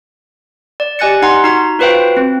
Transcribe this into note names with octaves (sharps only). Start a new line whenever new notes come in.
D5
G4 D#5 G#5 F#6 A6 C#7
D#4 F#5 A#5 C6
D#4 F#4 A#5
F4 F#4 B4 C5 F5 G5
C4